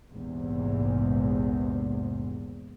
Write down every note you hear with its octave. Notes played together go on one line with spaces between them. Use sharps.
A#1 E2 G#2 C3